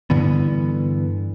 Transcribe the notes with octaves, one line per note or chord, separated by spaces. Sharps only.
G2 D3 E3 B3